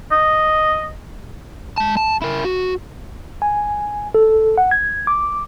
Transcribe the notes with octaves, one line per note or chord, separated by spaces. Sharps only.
D#5
G#3 A5
A5
E4 A#4
F#4
G#5
A4
F#5
G#6
D6